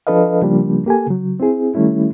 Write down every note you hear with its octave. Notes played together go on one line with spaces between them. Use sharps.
F3 D4 A4 B4 D#5 F5
C#3 F3 G3 A#3 D4
A#3 G4 A4 G#5
C#3 F#3
C4 E4 G#4
D#3 G3 A3 C#4 E4